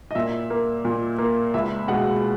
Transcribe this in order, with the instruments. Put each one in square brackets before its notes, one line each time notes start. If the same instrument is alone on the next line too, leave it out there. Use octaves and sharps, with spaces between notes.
[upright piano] D#5
A#2 E5
A#3
A#2
A#3
C#2 E5
B2 G#3 F#5